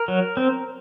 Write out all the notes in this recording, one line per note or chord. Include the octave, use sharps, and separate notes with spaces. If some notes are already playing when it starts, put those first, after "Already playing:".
Already playing: A#4
F#3
C4